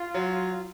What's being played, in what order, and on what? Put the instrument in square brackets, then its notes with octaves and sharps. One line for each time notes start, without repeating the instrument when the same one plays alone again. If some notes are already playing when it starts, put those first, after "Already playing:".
Already playing: [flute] F4
[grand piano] F#3